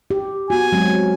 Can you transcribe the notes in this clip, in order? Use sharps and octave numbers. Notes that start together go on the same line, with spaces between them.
G4
B3 F#4 G#5
F#3 G#3 C4